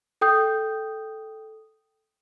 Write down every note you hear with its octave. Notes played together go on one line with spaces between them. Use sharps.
A4 G5 D#6 G6